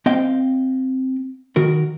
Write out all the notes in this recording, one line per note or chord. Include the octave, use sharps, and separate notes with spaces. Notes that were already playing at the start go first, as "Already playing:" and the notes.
C4 D#5 F5 G5
D#3 F#4 A#4